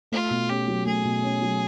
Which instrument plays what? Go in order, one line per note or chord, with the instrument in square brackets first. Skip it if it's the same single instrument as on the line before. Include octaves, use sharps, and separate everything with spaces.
[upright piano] A3 [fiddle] F4
[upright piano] B2
[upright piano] C#4 [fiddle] G4
[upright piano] F#3
[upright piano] A3 [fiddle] G#4
[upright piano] B2
C#4
F#3